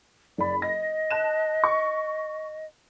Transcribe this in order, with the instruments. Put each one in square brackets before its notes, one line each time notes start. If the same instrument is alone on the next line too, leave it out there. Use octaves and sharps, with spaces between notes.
[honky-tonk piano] F#1 B5 [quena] D5
[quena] D#5 [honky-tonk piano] A#6
[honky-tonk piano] A5 F#6 E7
C#6